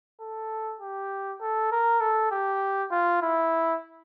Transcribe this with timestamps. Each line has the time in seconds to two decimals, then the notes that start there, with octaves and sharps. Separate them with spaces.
0.21 A4
0.81 G4
1.41 A4
1.72 A#4
2.01 A4
2.31 G4
2.91 F4
3.22 E4